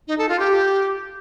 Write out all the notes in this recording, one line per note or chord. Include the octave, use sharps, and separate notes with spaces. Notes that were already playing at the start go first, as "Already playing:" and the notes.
D#4
A4
F4
G4